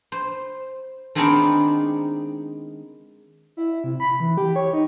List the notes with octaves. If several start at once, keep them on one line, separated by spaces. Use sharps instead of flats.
C5
D#3 G#3 B3 C4 D4 D#4
E4
C3
B5
E3
G4
C#5
D#4